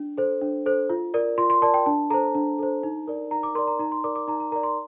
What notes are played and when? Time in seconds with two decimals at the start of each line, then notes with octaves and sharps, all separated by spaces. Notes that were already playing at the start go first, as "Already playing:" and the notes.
Already playing: D4
0.18 A4 C5
0.41 D4
0.66 A4 C5
0.90 F4
1.14 A#4 D5
1.38 F4 C6
1.50 C6
1.62 A#4 D5 A5
1.74 G5
1.86 D4 A5
2.10 A4 C5 A#5
2.35 D4
2.59 A4 C5
2.83 D#4
3.07 A#4 D5
3.31 D#4 A#5
3.43 D6
3.55 A#4 D5 C6
3.67 A#5
3.79 D#4 A#5
3.92 C6
4.04 A#4 D5 D6
4.16 D6
4.28 D#4 A#5
4.40 A#5
4.52 A#4 D5 A#5
4.63 C6